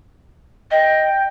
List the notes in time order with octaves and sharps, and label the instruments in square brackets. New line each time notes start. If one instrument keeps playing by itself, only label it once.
[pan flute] D#5 [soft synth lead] G5